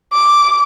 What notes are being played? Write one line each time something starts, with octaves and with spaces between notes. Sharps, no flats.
D6